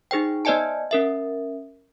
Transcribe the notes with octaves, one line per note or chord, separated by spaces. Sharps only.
D#4 G#4 C5 G5
B3 C5 D5 D#5 G#5 A5
C#4 A#4 E5